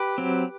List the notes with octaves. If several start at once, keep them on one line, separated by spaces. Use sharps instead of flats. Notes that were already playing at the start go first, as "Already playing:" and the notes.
Already playing: G4 B4
F#3 C4